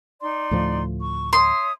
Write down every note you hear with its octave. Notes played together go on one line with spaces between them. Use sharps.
D#4 D5 C6
D2 A2 F3
C#6
C#5 E5 C6 D#6